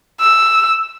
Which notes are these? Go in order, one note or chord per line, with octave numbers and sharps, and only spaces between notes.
E6